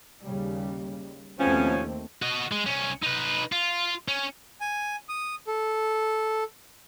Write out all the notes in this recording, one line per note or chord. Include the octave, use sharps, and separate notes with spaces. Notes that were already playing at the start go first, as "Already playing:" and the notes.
D#2 C#3 G3
D#2 B2 F3 A3 C4 C#4
F#4 D#5
G#3
C2 C#4
D#4 B4
F4
C#4
G#5
D#6
A4